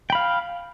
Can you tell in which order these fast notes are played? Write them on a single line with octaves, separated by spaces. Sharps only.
G5 B5 F5